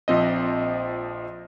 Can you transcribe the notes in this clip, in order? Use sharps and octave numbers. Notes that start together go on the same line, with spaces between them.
A#1 F3 C4 D#5